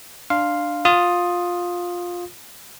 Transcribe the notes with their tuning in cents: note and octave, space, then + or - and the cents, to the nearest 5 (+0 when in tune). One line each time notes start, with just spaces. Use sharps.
D4 +15 F5 +0 C6 +0
F4 +15 D#6 +0